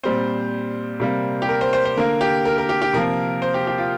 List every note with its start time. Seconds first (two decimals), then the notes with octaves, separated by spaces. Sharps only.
0.03 A#2 G3 C4 C5
1.00 C3 G3 A#3
1.42 G4
1.49 A#4
1.61 C5
1.73 C5
1.85 C5
1.97 D3 A#3 A#4
2.21 G4
2.45 A#4
2.58 A#4
2.69 G4
2.82 G4
2.93 C3 F3 A#3 A#4
3.42 C5
3.54 G4
3.67 G4
3.78 F4